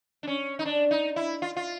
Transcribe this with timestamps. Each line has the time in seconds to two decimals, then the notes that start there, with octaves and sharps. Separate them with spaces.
0.23 D4
0.27 C#4
0.59 D#4
0.65 D4
0.91 D#4
1.16 E4
1.42 F4
1.57 F4